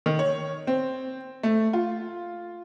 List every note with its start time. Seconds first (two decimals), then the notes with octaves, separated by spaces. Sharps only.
0.06 D#3
0.19 C#5
0.67 C4
1.43 A3
1.73 F4